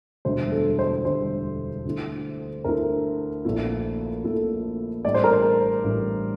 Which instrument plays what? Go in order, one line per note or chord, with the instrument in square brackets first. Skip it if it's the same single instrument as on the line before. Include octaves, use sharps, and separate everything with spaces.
[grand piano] E1 D2 D3 G3 [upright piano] C5
[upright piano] A4
C5
[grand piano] E1 D2 D3 G3 [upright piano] C5
[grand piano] D2 D3 A3 E4
[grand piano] D2 D3 A3 E4 [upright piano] A#4
[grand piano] A#1 A#2 A3 E4
[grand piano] A#1 A#2 A3 E4 [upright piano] A4
[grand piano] A1 A2 G3 D4 [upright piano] D5
[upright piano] C5
A#4
C5
[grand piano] A1 A2 G3 D4